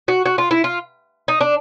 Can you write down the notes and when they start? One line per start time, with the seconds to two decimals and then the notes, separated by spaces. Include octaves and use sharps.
0.08 F#4
0.25 F#4
0.38 F4
0.51 E4
0.64 F4
1.28 D#4
1.41 D4